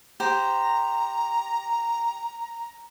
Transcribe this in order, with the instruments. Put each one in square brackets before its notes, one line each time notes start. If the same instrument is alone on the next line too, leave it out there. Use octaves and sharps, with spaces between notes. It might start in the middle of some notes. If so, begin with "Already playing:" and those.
[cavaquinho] G4 C5 [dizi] A#5